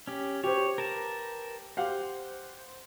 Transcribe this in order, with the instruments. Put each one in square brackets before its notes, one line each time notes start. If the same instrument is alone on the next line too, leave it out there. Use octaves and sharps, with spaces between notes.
[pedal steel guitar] C#4 G4
[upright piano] G4 C5 [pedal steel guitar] C#5
[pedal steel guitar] A#4 B4 A5
[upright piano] G4 F5 F#5 [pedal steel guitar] C5